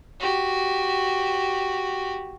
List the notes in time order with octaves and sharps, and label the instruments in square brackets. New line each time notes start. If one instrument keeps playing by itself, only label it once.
[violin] F#4 G4